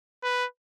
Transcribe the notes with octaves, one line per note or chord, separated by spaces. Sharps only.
B4